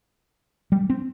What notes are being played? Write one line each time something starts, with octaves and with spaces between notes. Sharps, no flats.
G3
C4